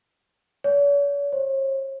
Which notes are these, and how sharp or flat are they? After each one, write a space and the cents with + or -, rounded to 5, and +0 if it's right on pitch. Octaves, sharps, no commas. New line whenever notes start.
C#5 +45
C#5 -45